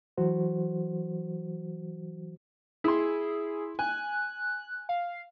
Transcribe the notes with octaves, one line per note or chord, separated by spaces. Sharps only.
E3 F#3 F#4 C5
E4 G#4 C6
G#5 F#6
F5